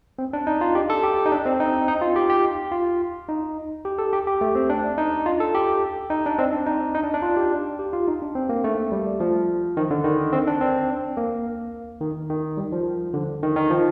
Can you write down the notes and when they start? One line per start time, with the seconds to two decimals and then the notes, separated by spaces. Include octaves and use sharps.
0.19 C4
0.33 D4
0.47 D#4
0.61 F4
0.75 G4
0.90 A4
1.03 G4
1.26 D#4
1.32 D4
1.46 C4
1.60 D#4
1.88 D#4
2.02 F4
2.16 G4
2.30 G4
2.72 F4
3.29 D#4
3.85 G4
3.98 A4
4.13 G4
4.27 G4
4.41 A3
4.55 C4
4.70 D4
4.98 D#4
5.26 F4
5.40 A4
5.54 G4
6.10 D#4
6.26 D4
6.39 C4
6.53 D4
6.66 D#4
6.95 D#4
7.03 D4
7.14 D4
7.22 F4
7.37 G4
7.79 G4
7.93 F4
8.08 D#4
8.22 D4
8.35 C4
8.49 A#3
8.64 A3
8.92 G3
9.20 F3
9.77 D#3
9.91 D3
10.04 D#3
10.33 C4
10.47 D4
10.61 C4
11.17 A#3
12.01 D#3
12.30 D#3
12.57 G3
12.72 F3
13.14 D3
13.43 D#3
13.56 D#3
13.70 F3